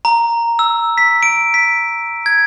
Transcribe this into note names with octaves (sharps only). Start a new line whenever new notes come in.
A#5
E6
B6
D7
B6
G#6